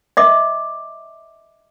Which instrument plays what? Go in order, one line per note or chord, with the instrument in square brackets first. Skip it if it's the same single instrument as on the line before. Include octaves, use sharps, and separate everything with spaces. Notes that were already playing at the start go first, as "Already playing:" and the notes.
[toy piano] D#5 E5 D6